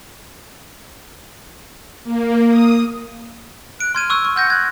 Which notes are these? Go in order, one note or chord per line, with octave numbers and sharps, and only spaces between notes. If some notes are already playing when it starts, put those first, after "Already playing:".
A#3
D#6
F#6 D7
C6 F6 G#6 D#7
C#6 E6 F#6
C#6
F#5 F6 G6 A#6
F#6 G#6